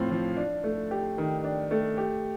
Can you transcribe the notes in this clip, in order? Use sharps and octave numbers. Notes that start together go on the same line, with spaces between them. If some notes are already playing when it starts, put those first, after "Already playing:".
Already playing: A2 F3 C4 F4
F3
D4
A3
G4
D#3
D4
A3
G4